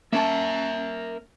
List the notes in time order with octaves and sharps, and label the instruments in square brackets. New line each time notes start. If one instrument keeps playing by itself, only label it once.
[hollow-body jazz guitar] A#3 C#4 A5 [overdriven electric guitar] A#4 E5